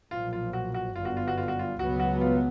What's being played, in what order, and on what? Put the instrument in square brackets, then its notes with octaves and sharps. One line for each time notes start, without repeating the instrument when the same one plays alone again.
[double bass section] B1 A#2 F3 [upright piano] F4
[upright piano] F4
F#4
F#4
[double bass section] G1 F#2 D3 G3 B3 [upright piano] F4
[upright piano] F#4
F4
F#4
F4
F#4
F4
[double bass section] C#2 B2 F#3 B3 [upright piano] F#4
[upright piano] F#4
F4